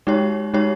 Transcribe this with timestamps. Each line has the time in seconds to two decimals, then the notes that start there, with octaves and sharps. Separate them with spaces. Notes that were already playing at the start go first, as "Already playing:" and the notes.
0.07 G#3 D#4 G4 C#5
0.54 G#3 D#4 G4 C#5